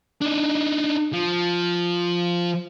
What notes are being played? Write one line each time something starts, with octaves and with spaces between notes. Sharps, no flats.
D4 D#4
F3